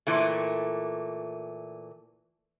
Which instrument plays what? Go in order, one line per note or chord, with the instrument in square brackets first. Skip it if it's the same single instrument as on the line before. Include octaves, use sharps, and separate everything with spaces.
[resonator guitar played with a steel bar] A#2 E3 A3